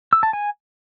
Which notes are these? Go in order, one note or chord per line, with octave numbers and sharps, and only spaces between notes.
E6
A5
G#5